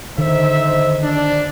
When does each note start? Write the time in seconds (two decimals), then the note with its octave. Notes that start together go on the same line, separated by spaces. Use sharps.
0.18 D3 D#3 D#4 C5 E5
1.02 D4